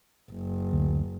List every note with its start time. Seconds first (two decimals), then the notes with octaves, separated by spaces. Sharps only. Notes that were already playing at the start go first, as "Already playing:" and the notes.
0.31 F#1
0.73 D2